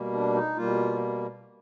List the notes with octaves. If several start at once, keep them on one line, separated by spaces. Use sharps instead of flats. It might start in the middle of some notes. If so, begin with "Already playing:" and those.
Already playing: B2 G3 A#3
D4
D#4
B2 G3 A#3 F4